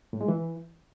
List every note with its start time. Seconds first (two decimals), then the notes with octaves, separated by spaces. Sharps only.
0.13 A2
0.21 G#3
0.28 E3